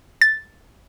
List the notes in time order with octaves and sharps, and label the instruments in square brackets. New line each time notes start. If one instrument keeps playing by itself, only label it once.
[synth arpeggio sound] A6